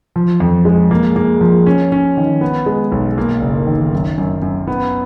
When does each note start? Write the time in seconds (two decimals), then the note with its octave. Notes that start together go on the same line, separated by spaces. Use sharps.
0.16 F3
0.40 F2
0.65 G#3
0.91 A#3
1.16 A#3
1.41 F3
1.66 C#4
1.92 C#4
2.17 D#3
2.41 B3
2.66 G#3
2.92 B1
3.18 A#3
3.42 F#1
3.67 D#3
3.93 F#2
4.18 F#2
4.42 F#2
4.67 B3